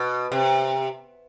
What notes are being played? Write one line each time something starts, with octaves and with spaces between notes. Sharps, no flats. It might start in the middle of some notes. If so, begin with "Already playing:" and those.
Already playing: B2
C3